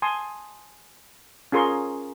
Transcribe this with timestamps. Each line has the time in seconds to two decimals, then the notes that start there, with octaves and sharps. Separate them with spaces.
0.02 G#5 A5 C6 D#6
1.52 C#4 F4 G#4 A#4 C6 C#6